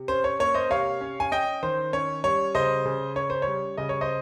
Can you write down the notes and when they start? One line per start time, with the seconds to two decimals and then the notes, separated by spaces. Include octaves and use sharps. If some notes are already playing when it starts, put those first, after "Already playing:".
Already playing: C3
0.08 C#4 C5
0.24 C#5
0.39 A#3 C#5
0.54 C5 D#5
0.70 C3 C#5 F5
1.01 C#4
1.20 G#5
1.32 C#4 D#5 G5
1.63 D#3 C5
1.93 C#4 C#5
2.24 G3 C#5
2.55 C#3 C5 D#5
2.85 C#3
3.16 C#4 C#5
3.30 C5
3.42 G3 C#5
3.77 C#3 D#5
3.89 C#5
4.01 C5 D#5